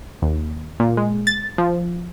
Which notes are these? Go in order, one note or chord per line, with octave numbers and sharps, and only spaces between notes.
D#2
A#2
G#3
A6
F3